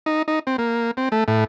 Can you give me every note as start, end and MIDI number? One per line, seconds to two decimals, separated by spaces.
0.06 0.22 63
0.28 0.39 63
0.47 0.57 60
0.58 0.91 58
0.97 1.09 60
1.12 1.24 57
1.28 1.44 45